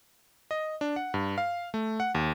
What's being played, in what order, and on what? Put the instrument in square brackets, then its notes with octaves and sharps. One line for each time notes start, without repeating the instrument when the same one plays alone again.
[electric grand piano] D#5
D4
F#5
G2
F5
A3
F#5
D#2